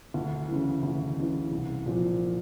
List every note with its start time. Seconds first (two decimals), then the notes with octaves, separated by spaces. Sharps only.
0.14 D2
0.49 C#3 E3
0.83 D2
1.17 C#3 E3
1.51 C2
1.86 A#2 F3